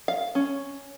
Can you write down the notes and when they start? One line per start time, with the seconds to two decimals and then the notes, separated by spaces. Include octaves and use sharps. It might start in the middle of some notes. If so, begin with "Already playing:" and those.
0.08 F5
0.35 C#4